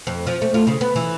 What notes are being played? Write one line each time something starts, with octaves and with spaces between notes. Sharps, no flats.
F2
F3
A3
F4
C#3
B3
E3